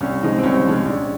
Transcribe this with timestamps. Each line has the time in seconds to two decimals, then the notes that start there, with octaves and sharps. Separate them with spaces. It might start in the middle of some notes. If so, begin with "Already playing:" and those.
0.01 C2 C#4
0.22 C3 F3 G#3 D#4
0.39 C4
0.43 C2 C#4
0.65 C3 F3 G#3
0.86 A#1